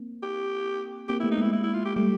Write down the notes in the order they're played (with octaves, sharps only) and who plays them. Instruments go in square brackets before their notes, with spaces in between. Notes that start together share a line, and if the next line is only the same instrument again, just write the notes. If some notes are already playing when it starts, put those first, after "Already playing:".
Already playing: [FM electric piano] A#3 C4
[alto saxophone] G4
[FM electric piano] A#3 C4 [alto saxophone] G4
[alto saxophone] E4
[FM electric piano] A3 B3
[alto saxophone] D#4
[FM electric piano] G#3 A#3 [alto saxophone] E4
[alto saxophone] E4
E4
F4
G4
[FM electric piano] G3 A3 [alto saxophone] G4